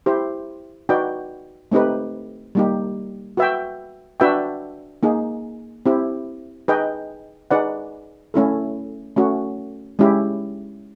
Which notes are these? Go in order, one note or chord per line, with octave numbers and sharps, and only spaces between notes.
E4 G4 C5
D#4 F#4 B4 D5 G5
A3 C4 D#4 G4 B4
G3 A#3 D#4 G4
F#4 B4 E5 G5
D4 F#4 B4 E5 G5
A#3 D#4 G#4
C4 E4 G4
D#4 G#4 B4 D#5 G5
D#4 G#4 B4 D5 F#5
A3 C#4 E4 A4
A3 C#4 F#4
G#3 C#4 E4 G4